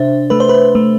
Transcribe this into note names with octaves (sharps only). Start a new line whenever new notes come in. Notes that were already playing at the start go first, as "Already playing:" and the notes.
Already playing: C3 D4 C5 E5
A3 B4
C5
B4
A3